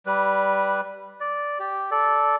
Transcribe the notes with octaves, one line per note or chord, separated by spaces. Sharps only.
G3 B4
D5
G4
A4 D5